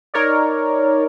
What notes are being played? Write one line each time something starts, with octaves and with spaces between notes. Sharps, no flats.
D#4 A#4 C#5 D5